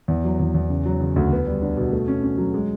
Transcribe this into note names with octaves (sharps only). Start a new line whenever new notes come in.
E2
F#3
E2
E2
C#3
F#3
C#3
D2
B3
G3
D4
B2
A3
C#4
C#4
F#3
G#3